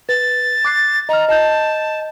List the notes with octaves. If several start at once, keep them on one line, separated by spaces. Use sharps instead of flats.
B4 A6
D6 F#6 C7
D#5 A#5 F6
D#5 A5 G6